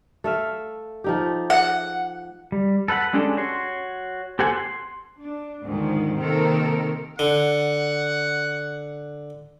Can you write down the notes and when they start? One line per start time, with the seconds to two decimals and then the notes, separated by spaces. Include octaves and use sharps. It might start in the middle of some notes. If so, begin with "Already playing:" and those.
0.24 A3 E5 F5
1.04 F3 D#4 G4
1.50 F#5
2.52 G3
2.88 A4 B4 E5 F#5 B5
3.13 G#3 C#4 D4 G4 A4
3.37 F#4 C#5 C6
4.39 G4 A4 C5 F#5 G#5
4.51 C6
5.19 D4
5.64 D2 G#2 D#3 F3
6.18 C3 D#3 A#3 C4 A4 A#4
7.19 D3 F#5